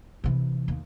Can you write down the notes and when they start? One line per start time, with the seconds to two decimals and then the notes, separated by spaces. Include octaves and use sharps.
0.24 C3 E3
0.68 D#2